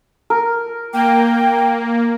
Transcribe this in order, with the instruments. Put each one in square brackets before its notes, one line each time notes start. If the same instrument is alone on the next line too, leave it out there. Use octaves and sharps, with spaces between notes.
[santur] A#4
[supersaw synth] A#3 [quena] G5